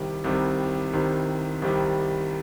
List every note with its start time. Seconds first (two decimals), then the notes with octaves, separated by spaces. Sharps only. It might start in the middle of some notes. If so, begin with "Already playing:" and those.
Already playing: C2 C3 D#3 G3
0.24 C2 C3 D#3 G3
0.93 C2 C3 D#3 G3
1.62 C2 C3 D#3 G3